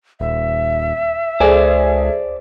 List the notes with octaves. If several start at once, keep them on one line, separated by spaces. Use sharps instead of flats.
D#1 E5
C#2 G#4 A4 C5 D5 G#5